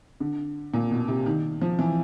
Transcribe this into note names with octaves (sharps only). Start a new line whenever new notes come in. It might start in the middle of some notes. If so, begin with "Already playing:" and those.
D3
A#2
B2
C3
D#3
F3
E3